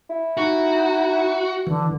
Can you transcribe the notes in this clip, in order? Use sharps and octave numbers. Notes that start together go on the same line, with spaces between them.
E4
D#4 F#4
D3 E3